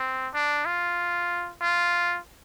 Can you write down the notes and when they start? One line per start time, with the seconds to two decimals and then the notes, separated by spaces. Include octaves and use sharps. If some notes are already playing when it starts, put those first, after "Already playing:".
Already playing: C4
0.34 D4
0.65 F4
1.61 F4